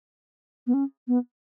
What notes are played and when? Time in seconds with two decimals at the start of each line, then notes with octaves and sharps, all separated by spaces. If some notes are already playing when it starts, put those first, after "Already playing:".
0.67 B3
0.74 C#4
1.08 B3